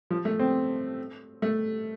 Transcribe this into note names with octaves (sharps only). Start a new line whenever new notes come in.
F3
A3
C4
A3